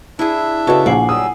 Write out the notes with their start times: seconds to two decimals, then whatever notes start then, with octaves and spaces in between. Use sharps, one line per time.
0.19 D4 E4 G#4 E5
0.67 C#3 F#4 A4 B4 D#5 A5
0.86 A#1 F#5 G#5 D6 C7
1.09 F#3 G3 D#6 E6